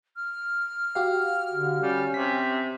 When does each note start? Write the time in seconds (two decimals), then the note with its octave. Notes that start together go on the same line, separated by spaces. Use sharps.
0.16 F6
0.95 F#4 G4 F5
1.53 D3
1.82 G3 C#4
2.14 C3 B6